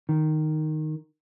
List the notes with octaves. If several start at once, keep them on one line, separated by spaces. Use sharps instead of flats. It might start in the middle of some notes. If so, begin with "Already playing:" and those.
D#3